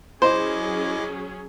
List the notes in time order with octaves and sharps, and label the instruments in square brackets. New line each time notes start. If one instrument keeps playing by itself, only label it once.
[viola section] F#3 C#4 G#4 [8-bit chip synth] E4 D#5 D6 [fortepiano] C5